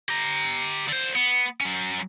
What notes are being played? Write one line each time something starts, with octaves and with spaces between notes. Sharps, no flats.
G4 A#5
D3 C5
B3
F#3 C#4